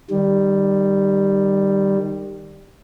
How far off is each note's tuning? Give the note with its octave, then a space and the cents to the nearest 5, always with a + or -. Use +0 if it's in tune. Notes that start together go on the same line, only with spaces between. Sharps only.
D#3 -25 G3 +0